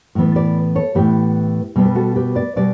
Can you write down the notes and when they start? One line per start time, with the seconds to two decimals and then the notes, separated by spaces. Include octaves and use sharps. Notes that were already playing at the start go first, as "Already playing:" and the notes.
0.15 A2 E3 B3
0.36 B4 D5
0.75 A4 C#5
0.95 A2 E3 B3 G4 B4
1.76 B2 G3 B3
1.86 B4
1.95 F#4 A4
2.16 G4 B4
2.35 B4 D5
2.56 B2 G3 B4 D5